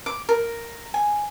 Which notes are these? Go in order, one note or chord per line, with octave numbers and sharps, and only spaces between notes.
D6
A#4
G#5